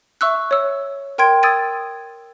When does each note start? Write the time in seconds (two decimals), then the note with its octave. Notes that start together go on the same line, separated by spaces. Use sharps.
0.21 E5 C#6 E6 F#6
0.51 C#5 E6
1.18 A#4 G5 C6 G#6 D7
1.43 D#6 E6 G#6 A6 D7 D#7